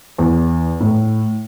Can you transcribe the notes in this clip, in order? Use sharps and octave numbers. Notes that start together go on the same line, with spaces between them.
E2
A2